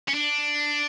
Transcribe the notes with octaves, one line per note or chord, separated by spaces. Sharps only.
C#4
D4